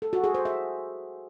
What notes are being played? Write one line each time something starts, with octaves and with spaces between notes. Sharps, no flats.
A4
F#4
G#4
C5
E5